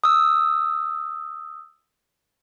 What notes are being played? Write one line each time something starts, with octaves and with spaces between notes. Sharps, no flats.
D#6 E6